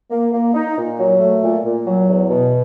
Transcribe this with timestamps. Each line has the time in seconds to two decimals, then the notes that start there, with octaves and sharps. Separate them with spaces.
0.10 A#3
0.33 A#3
0.54 D#4
0.76 A#2
0.98 F#3
1.20 A3
1.42 A#2
1.64 A#2
1.86 F#3
2.08 E2
2.29 B2